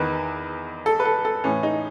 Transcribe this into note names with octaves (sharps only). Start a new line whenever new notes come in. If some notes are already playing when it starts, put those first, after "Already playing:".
Already playing: E2 D#3 B4
A4
B4
A4
A4
A2 E3 C#4
D#4